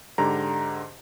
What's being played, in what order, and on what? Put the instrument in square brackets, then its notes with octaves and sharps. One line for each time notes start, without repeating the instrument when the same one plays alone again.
[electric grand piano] G#2 D3 G4 A#5